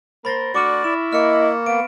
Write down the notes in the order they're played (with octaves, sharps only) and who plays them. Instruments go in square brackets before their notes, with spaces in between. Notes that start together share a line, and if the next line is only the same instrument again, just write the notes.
[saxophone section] A#3 A#4 C5 [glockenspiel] B5 A6 A#6
[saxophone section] A3 D4 F#4 [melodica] D5 [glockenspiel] C#6 D6 F6
[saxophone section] E4 [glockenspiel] E7
[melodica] A#3 [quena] D#5 [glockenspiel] F6 C#7
[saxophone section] B3 [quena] F5 [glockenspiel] D7